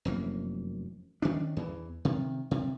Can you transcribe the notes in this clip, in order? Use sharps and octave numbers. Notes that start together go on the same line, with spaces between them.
F1 F#2 E3 A#3
D#3 C#4 D4
E2 E3
C3 D#3
C3